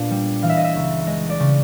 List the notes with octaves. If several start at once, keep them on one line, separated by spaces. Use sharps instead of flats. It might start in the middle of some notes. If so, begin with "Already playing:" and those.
Already playing: A#2 B3 D4
G3
E3 F5
E5
D#5
E5
C#2
G#3 D#5
D5
C#3